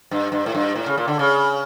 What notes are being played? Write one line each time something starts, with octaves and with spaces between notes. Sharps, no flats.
G2
G2
A2
G2
A2
C#3
A#2
D3
C#3